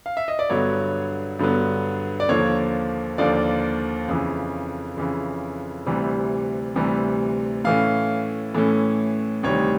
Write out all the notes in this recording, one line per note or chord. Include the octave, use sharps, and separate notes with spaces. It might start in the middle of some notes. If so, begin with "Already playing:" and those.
F5
E5
D#5
D5
G2 D3 F#3 B3 C#5
G2 D3 F#3 B3
D5
D#2 D3 F3 A#3 C#5
D#2 D3 F3 A#3 D5
F2 C#3 E3
F2 C#3 E3
D2 C3 E3 G3
D2 C3 E3 G3
A2 E3 A3 C#4 F5
A2 E3 A3 C#4
D2 C3 D#3 G3 C#5